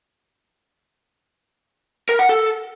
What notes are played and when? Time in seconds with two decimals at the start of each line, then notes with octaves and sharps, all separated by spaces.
2.09 A#4
2.19 F#5
2.29 A4